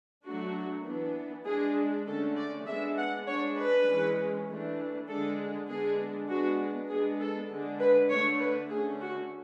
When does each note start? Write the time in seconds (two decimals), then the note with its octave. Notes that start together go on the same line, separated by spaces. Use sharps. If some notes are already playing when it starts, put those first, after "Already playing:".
0.24 F#3 A3 D4 F#4
0.85 E3 B3 D4
1.45 G#3 D4 G#4
2.07 D3 A3 C#4 A4
2.36 D5
2.66 G#3 B3 D4 E5
2.97 F#5
3.27 G#3 D4 C#5
3.58 B4
3.87 E3 G#3 C#4
4.48 E3 A3 D4
5.08 D3 G#3 D4 A4
5.68 D3 G#3 B3 D4 G#4
6.28 G#3 B3 D4 F#4
6.89 G#3 B3 D4 G#4
7.19 A4
7.50 D3 G#3 D4
7.79 B4
8.09 D3 A3 D4 C#5
8.40 B4
8.70 D3 A3 C#4 G#4
9.00 F#4